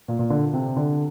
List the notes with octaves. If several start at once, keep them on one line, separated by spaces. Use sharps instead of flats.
A#2
A#2
D3
C3
D3